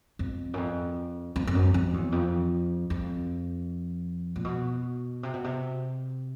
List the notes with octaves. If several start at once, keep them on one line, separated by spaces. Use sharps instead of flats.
F2
F#2
F2
F2
F2
F#2
F2
E2
F2
F2
A#2
B2
C3
B2
C3